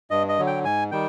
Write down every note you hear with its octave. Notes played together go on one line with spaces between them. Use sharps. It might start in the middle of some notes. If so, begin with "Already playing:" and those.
G2 D#5
D#5
D3 F#3
G5
G#2 G#5
D#3 G3 G5